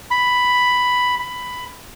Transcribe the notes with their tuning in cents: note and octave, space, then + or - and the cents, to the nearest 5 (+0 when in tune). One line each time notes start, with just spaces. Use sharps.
B5 +5
B5 +10